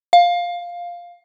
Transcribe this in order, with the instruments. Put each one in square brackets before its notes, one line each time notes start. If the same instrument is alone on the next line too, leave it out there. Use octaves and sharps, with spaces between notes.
[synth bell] F5